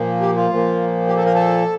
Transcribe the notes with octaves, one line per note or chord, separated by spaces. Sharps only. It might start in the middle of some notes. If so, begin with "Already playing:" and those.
Already playing: A#2 F3 A#3
G4
F4
A#2 F3 A#3
G4
A4
A#4
A4